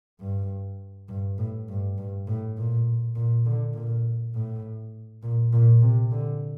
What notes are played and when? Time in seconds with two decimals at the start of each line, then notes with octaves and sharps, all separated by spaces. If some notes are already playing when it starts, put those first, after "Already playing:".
0.21 G2
1.09 G2
1.38 A2
1.68 G2
1.98 G2
2.27 A2
2.57 A#2
3.15 A#2
3.46 D3
3.75 A#2
4.34 A2
5.23 A#2
5.53 A#2
5.82 C3
6.11 D3